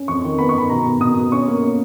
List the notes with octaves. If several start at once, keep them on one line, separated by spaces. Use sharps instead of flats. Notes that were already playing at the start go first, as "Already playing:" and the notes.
Already playing: C#4
F2 C#6
D#3
B3 B5
C#6
D#3 B5
B2 A#5
B2
B2 D#6
B2
C#4 C#6
A#3
C#4